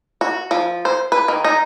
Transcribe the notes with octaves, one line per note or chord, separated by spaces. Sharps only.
F#4
F3
C5
B4
D#3
D#4